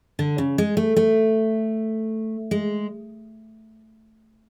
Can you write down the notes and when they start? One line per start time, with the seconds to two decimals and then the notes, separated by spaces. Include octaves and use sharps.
0.19 D3
0.38 C#3
0.58 G#3
0.77 A3
0.96 A3
2.51 G#3